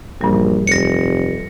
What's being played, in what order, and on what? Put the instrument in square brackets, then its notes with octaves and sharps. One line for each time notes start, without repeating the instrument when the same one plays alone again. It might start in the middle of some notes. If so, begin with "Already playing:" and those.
[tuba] A#1 [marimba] G2 E3 G3
[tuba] F1 [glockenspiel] A#6 C#7